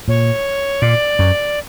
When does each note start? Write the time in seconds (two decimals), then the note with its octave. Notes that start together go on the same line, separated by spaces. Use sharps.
0.08 A#2 C#5
0.82 A#2 D5
1.19 F#2